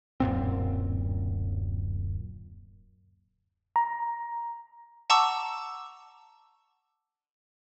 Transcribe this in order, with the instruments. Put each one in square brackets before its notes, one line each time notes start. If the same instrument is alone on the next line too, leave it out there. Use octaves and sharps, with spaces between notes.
[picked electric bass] D1 F#2 A#2 C4
[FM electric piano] A#5
[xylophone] F#5 A5 A#5 C#6 D6 E6